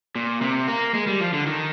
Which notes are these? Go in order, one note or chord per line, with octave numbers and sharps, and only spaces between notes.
A#2
C3
A#3
G#3
G3
F3
D3
D#3